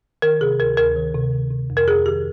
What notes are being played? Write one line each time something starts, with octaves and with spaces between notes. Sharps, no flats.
D#3 A#4
C3 G#4
D2 A#4
D2 A#4
D#3
C3
D#3
C3
F2
A#4
F2 G#4
D#3 G4